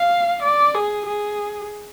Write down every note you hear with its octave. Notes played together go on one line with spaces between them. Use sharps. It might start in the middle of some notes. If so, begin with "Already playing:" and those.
Already playing: F5
D5
G#4
G#4